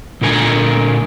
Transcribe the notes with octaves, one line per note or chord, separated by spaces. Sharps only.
A#2 D3 A#4 G#5